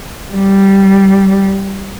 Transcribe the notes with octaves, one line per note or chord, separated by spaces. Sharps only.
G3